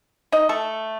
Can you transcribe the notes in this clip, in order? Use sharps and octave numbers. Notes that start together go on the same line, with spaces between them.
D#4 D#5
A3 A4